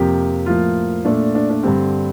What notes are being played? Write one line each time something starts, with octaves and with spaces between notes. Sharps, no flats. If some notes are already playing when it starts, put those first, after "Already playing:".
Already playing: F2 C3 F3 A#3 G4
A2 F3 A#3 F4
A#2 A3 D4
D4
D4
G2 D3 G3 C4